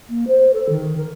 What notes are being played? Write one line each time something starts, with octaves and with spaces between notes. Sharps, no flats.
A#3
C5
A4
D#3
A#4